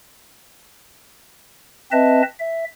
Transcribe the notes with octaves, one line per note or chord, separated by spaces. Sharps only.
C4 B4 D#5 E5 A5
E5